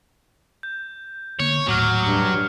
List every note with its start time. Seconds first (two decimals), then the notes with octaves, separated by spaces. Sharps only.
0.63 G6
1.40 D3 A#3 B3 C#5
1.68 D#1 A2 F#3 D6 F6
2.00 G2 D#6 C#7